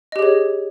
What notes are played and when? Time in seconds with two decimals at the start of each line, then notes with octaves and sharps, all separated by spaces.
0.12 D#5
0.16 G4
0.19 G#4
0.22 C#5